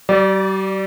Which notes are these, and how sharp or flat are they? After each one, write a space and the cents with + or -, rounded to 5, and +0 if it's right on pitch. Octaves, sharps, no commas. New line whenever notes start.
G3 -40 D5 +0